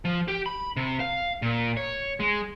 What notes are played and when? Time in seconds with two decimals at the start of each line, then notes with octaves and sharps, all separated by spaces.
0.05 F3
0.28 G4
0.46 B5
0.77 C3
1.00 F5
1.42 A#2
1.77 C#5
2.20 G#3